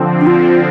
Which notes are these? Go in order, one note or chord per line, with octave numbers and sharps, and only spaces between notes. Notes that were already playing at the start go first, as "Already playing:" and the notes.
Already playing: D3 F3 C4
D4
F4